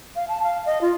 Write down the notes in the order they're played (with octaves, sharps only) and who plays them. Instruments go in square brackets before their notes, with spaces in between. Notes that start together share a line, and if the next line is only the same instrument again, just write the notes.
[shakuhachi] F5
A5
F5
D#5
F4